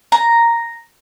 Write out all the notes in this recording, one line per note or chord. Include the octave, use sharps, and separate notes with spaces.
A#5